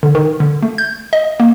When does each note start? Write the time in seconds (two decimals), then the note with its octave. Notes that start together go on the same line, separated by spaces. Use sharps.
0.03 D3
0.15 D#3
0.40 D3
0.63 A3
0.78 G6
1.13 D#5
1.40 A#3